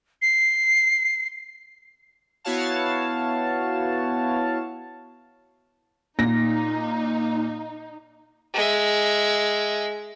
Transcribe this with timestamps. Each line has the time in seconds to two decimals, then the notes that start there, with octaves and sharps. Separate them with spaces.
0.22 C7
2.44 B3 E4 F#4 C#5 F5 A5
6.19 A#2 D#4 A#6
8.54 G#3 E5